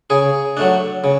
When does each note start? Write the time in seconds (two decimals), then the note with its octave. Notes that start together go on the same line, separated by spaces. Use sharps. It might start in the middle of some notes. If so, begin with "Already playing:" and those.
0.10 C#3 G#4
0.57 F#3 A3 D4
1.04 C#3